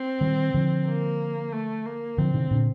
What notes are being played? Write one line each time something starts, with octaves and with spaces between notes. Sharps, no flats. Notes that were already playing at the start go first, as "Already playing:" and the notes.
Already playing: C4
D#3 G3
D3 F3
A#3
A3
A#3
D3 F3 C4
C3 D#3
A#2 D3